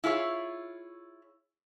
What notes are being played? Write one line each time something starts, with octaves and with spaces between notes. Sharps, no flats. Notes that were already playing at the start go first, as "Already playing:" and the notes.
E4 F4 G#4 C#5